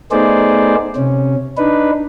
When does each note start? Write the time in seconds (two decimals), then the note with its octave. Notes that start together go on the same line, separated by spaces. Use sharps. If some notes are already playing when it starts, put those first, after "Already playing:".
0.11 A3 B3 D#4 G#4 C5 D5
0.96 C3 C#4
1.57 D4 D#4 B4